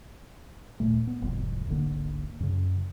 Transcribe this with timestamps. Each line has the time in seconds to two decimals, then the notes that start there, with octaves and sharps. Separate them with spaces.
0.80 D#1 C#2 A#2 A3
1.07 B3
1.22 E1 C2 F2 G#2
1.68 D1 G#1 D3 A#3
2.40 F#2 C#3